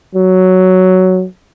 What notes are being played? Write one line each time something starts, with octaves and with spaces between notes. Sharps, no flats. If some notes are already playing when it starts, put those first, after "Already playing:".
F#3